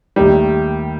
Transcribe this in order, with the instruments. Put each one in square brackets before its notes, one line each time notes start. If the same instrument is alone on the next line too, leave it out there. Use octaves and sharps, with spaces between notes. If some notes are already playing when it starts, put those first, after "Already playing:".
[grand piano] D#2 D#3 A3 D#4 [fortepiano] G3